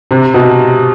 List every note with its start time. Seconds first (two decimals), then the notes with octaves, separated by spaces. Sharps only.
0.11 C3
0.34 B2